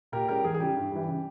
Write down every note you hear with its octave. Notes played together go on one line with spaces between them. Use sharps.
A#2 G4 A#4
G#3 C#4 G4 A#4
E2 G#4
G#4
C#3 G3 G4
G2
E3 G3
C#3